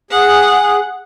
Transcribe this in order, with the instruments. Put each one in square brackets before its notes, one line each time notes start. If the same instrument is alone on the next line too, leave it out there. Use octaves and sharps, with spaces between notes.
[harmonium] G#4 [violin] F#5